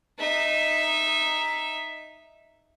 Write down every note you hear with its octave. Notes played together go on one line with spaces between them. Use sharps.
D#4 E5